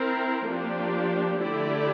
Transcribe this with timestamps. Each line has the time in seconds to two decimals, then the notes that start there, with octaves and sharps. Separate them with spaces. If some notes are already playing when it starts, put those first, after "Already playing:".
Already playing: C4 E4 A#4
0.46 F3 A#3 D4 G4
1.39 D3 A3 E4 G4 D5